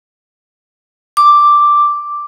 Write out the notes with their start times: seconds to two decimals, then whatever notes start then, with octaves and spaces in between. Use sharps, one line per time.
1.17 D6